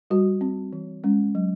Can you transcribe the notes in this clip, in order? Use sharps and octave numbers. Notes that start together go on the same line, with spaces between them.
G3 F#4
C4
E3
G#3 C#4
F#3